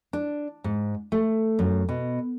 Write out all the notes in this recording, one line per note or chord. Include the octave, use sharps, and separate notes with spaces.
D4
G#2
A3
F#2
B2